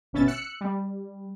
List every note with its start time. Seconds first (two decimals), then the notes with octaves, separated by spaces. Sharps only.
0.13 G1 B2 C#4 E5 A6
0.28 E6 F#6 C#7
0.61 G3